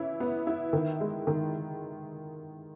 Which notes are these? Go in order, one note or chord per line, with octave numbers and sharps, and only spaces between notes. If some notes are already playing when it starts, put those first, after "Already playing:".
Already playing: E3 C#4 E4
B3
E4
D#3
G#3
D#3